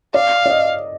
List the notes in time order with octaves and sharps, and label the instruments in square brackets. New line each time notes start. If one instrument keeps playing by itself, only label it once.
[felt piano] D5 [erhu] F5
[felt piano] D5
D#5